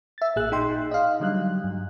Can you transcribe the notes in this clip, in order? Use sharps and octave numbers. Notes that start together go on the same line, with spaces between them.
E5 A6
A1 A#2 G#4 E6 F#6
D#4 G5 C6
D#5 F5
D3 F#3 G3 F#6
G2